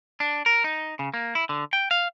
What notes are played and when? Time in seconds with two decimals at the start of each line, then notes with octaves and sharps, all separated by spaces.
0.20 D4
0.46 A#4
0.64 D#4
0.99 C#3
1.14 A#3
1.35 E4
1.49 D3
1.73 G5
1.91 F5